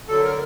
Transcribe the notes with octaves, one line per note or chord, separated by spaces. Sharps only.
D3 F#3 A4
A#4